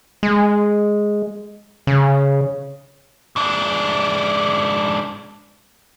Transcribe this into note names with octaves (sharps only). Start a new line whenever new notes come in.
G#3
C#3
G#2 D4